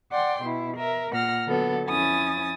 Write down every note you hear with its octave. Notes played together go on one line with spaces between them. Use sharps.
D5 F#5 G5 C6
B2 E4
A#4 E5
A#2 F#5 F6 A#6
D3 F#3 B3 A4
F2 C#4 E4 G#5 D#6 A6